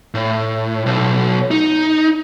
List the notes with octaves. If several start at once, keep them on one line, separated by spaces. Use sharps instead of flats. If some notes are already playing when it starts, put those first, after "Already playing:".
A2
B1
D#4